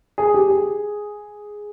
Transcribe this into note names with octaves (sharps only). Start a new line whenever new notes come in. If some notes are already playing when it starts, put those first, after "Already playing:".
G#4
G4
G#4